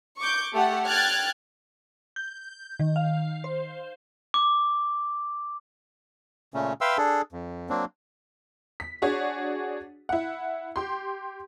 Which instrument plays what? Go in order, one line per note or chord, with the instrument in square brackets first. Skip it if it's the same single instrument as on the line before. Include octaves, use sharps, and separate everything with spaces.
[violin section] C#6 D6 G6
A3 G4 F#5
G5 F6 F#6 G#6 A6
[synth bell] G6
D#3
F5
C5
[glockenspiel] D6
[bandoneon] A#2 C#3 A3 C#4
B4 E5 F5 G5 C6 E6
D4 G#4 A4
F2
F#3 A#3 C4 D4
[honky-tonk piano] B6
D4 F#4 G#4 C#5
E4 F#5
G4 C6